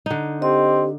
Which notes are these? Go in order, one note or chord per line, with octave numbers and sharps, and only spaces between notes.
D3 D#4
C4 G4 D#5